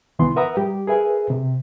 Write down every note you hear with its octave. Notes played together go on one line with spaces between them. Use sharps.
C2 D#3 E3 B3 C6
A#4 B4 E5 F#5 A#5 D#6
G3 G4
G#4 A#4 B4 E5 G#5
C3